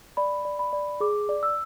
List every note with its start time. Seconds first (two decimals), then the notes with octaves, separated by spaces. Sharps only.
0.17 D5 B5
0.45 D5
0.59 B5
0.73 D5
1.00 G#4 D6
1.29 D5
1.43 E6